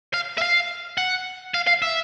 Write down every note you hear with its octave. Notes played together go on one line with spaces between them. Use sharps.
F5
E5
F5
F#5
F5
F5
E5